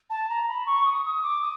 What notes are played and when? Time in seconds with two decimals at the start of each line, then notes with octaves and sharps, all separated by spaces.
0.10 A5
0.29 A#5
0.48 B5
0.66 C#6
0.85 D#6
1.04 D#6
1.23 D6
1.41 D#6